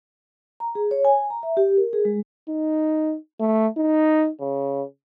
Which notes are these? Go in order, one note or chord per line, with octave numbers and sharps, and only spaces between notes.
A#5
G#4
C#5
G#5
A#5
E5
G4
A#4
G#4
G#3
D#4
A3
D#4
C#3